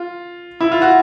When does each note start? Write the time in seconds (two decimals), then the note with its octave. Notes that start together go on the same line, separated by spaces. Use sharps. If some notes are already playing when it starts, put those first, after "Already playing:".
Already playing: F4
0.60 E4
0.72 F4
0.81 F#4